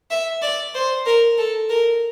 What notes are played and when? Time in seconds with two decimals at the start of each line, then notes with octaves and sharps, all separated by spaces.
0.10 E5
0.42 D5
0.75 C5
1.06 A#4
1.38 A4
1.69 A#4